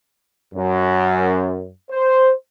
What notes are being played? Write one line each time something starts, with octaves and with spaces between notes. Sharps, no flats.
F#2
C5